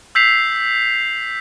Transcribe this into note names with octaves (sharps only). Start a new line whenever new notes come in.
E6 G6 B6 C7 F7